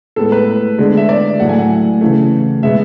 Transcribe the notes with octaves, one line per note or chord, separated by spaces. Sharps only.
A2 G#3 B3 A4
B4
D3 G#3 B3
E5
D5
A2 F#3 A3 F#5
G#5
F#5
C#3 E3 A3
B2 G#3 B3 E5